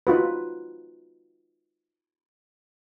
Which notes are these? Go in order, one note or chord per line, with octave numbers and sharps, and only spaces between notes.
D#4 F4 F#4 B4